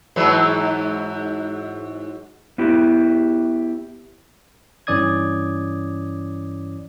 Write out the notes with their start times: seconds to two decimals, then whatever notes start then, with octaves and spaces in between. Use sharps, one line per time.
0.16 G#2 E3 F#3
2.58 B3 E4 G4
4.87 G2 E3 C#4 D5 D#6 G#6